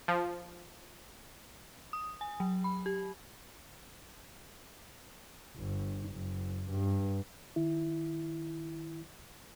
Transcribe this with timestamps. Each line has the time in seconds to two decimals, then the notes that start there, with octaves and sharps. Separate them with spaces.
0.08 F3
1.93 D#6
2.21 G#5
2.40 F#3
2.64 B5
2.86 G4
5.56 G1
6.10 F#1
6.70 G2
7.56 D#3 E4